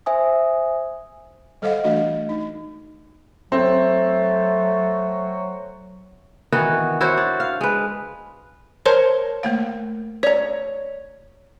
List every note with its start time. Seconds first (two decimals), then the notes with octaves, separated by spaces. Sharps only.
0.06 C5 E5 G#5 D#6
1.62 G3 A4 C5 D#5 F5 F#5
1.84 E3 A3 D4 F#4 D#5
2.29 D#4
3.52 F#3 A3 C4
6.52 D#3 E3 B3 F#4
7.01 E4 F#4 C5 C#5
7.17 D4
7.40 F5
7.61 G#3 B4
8.86 A#4 C5 C#5 A5 C6
9.43 A3 A#3 F5
10.23 C#5 D5 A#5